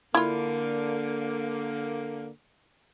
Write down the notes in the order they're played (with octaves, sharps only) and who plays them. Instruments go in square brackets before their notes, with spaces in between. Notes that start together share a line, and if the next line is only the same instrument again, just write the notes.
[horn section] D3 A#3 [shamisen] E4 F4